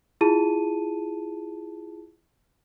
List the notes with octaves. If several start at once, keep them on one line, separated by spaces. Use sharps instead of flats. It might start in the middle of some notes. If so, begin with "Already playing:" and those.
E4 F4 G#4 A5 D#7